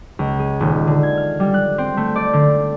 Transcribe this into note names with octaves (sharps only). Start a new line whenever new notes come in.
C#2
G#4
D#1
D3
G#6
F6
G3
F#6
C4
A3
D5
D3